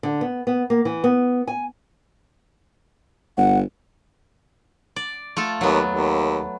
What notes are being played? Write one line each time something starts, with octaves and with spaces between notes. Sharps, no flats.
D3
B3
B3
A#3
E3
B3
G#5
G1 F#5
D5
A3 F4 A4
D#2 F#3 B3
D#2